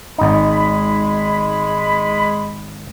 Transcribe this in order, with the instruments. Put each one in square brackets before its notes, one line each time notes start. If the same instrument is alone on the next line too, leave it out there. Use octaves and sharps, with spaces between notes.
[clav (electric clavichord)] G#1 D#4 [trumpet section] G#3 B5